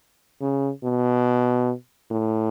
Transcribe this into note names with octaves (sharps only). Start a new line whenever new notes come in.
C#3
B2
A2